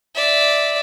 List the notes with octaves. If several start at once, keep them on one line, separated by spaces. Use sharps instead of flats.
D5 E5